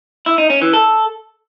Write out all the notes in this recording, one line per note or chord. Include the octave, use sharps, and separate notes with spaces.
E4
D#4
C#4
E3
A4